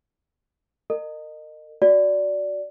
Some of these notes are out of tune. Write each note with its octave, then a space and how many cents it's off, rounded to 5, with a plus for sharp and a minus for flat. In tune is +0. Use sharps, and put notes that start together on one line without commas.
A#4 -30 D#5 -25
F#4 +0 D5 -10